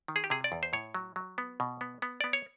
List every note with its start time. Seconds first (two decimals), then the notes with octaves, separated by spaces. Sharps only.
0.08 D#3
0.16 G#4
0.24 G4
0.30 C3 G#4
0.44 D5
0.52 E2
0.63 C5
0.73 A2 C#5
0.94 F#3
1.16 F#3
1.38 B3
1.60 B2
1.81 B3
2.02 B3
2.21 B3 D5
2.33 C#5